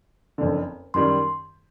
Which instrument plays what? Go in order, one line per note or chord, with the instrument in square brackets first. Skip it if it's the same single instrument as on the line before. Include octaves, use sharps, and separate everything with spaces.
[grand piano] F#1 F2 D3
[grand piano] F#2 D#3 G3 [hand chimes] C6